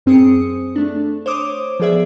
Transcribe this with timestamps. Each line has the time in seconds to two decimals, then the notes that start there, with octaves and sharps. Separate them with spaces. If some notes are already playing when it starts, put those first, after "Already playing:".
0.06 F#2 C4 G#4 D#6 C#7
0.76 A3 D4
1.26 C5 C#5 D6 D#6
1.80 F3 B3 G#4 D5 E5